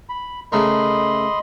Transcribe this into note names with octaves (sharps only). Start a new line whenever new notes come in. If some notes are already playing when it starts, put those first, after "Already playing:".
B5
C#3 A3 A#4 D#5 B5 C6